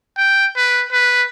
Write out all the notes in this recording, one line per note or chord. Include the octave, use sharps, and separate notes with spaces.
G5
B4
B4